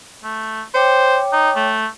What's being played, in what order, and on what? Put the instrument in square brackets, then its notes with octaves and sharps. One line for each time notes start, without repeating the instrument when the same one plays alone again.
[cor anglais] A3
[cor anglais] C5 [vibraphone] C#5 G5 D6
[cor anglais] D#4
A3